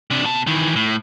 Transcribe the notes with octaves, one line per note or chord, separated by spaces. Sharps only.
C3 D4
B2 A5
D#3 E3
A2